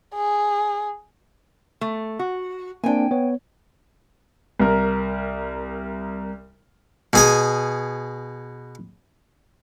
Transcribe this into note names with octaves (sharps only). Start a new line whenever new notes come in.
G#4
A3
F#4
A#3 C4 D4 G5 G#5
B3 C#5
C2 A#4
B2 G#4 G#5